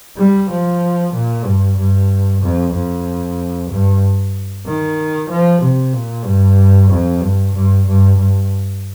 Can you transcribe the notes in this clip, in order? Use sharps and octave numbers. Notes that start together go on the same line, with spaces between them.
G3
F3
A#2
G2
G2
F2
F2
G2
D#3
F3
C3
A#2
G2
F2
G2
G2
G2
G2